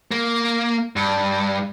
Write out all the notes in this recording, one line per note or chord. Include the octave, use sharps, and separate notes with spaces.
A#3
G2